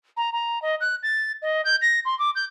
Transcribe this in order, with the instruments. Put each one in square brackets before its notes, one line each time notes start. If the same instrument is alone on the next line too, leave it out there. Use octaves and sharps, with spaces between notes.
[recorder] A#5
A#5
D#5
F#6
A6
D#5
G6
A#6
C6
D6
G6